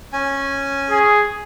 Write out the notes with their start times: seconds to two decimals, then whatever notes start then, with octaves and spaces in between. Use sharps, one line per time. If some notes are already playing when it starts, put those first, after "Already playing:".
0.13 C#4 G#5
0.91 G#4